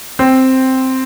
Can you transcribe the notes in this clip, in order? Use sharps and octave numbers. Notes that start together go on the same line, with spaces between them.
C4